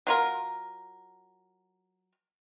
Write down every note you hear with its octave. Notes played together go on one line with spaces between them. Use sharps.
F#3 F4 A#4